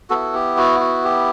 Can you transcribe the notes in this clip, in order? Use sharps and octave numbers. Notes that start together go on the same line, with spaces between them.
B3 E4 F#4 A4
G4
F#4
F#4
G4